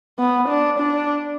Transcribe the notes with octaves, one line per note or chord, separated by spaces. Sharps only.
B3
D4
D4